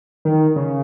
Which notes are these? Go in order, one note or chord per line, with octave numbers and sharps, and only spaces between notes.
D#3
C#3